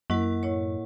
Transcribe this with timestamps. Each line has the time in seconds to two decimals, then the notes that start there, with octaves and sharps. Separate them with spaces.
0.10 F#2 A#3 E4 A#4 F#5
0.43 A2 E4 C#5